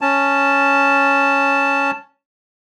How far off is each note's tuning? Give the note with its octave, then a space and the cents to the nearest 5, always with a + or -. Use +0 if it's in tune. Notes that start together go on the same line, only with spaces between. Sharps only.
C#4 +0 A5 +0